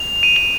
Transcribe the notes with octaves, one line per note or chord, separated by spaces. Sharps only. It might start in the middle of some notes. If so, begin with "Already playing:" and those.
Already playing: F7
D#7
F7